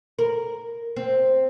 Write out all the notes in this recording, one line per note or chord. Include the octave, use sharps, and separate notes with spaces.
A#4
C4